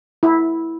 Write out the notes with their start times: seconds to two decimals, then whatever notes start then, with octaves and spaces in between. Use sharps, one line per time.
0.23 E4